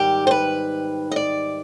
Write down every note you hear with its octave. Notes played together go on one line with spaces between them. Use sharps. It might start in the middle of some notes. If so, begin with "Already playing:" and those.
Already playing: G#2 D#3 G3 G4
C5
B4
D#5
D5